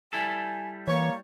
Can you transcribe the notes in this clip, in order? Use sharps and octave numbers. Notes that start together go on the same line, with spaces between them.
G3 E4 A4 G#5
E3 A#3 C#5